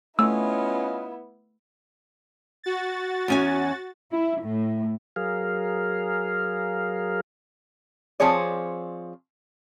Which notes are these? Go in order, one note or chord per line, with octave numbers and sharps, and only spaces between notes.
A3 B3 C#4 E4 F4 D#5 E6
F#4 A6
E2 C#4 G#5
E4
A2
F#3 G#4 A#4 F5
F3 C4 G#4 C#5 D5